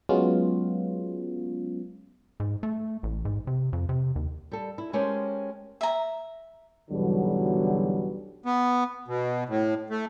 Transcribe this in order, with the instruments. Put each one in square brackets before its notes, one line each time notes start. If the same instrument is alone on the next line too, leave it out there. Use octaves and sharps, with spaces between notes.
[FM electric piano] F#3 G#3 B3 C#4 F4
[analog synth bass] G#2
A3
A1
G#2
C3
F2
C3
D#2
[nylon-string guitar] G3 A4
E4
G#3 C#4 G4 A4 A#4 C5
[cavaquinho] E5 A#5
[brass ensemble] B1 E2 B2 D3 F#3 G3
[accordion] B3
B2
A2
A3